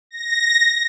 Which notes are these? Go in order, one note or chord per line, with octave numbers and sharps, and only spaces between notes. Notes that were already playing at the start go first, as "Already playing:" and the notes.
A#6